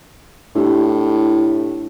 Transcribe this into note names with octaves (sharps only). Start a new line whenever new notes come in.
A2 D4 E4 G4